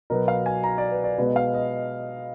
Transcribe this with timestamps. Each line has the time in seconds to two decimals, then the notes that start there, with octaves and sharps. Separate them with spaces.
0.10 B2 F#3 B3 A#4
0.28 F5
0.46 G#5
0.64 A#5
0.78 D5
0.91 B4
1.04 D5
1.18 B2 G#3 B3
1.36 F5
1.54 D#5